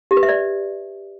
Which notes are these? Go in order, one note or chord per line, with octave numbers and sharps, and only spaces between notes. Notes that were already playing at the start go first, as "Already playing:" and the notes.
G4
B4
E5
D5